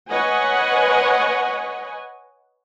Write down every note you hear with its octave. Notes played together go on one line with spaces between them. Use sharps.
B4 C#5 D#5 F#5 G#5